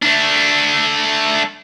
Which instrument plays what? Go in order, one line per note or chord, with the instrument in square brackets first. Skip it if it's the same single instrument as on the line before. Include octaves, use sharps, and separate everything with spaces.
[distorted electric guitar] A3 D4